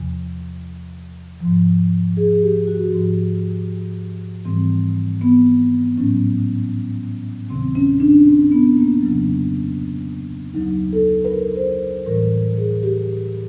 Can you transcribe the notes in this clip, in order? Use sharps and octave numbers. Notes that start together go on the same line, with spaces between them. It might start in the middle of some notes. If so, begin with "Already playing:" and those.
Already playing: E2 C3 F3
G#2 F3
G#4
G#4
G4
F#4
G#2 F3
G#2 E3 G3 C4
B3
A2 F#3 C#4
D2 C3 D#3 F#3 C4
C#4
D4
C4
B3
A#3
F2 C#3 F#3
D2 D3 F#3 D#4
A4
B4
A#4
C5
A2 E3 G3 A#4
G#4
G4